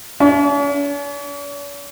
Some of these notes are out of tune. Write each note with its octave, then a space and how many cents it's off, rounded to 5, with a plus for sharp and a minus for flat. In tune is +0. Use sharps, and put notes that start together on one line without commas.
C#4 +45